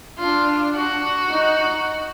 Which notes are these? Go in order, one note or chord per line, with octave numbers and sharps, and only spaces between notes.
D4 F4
F#4
D#4